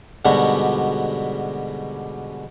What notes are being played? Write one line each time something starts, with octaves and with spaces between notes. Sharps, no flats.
G#2 B2 D3 G3 F#4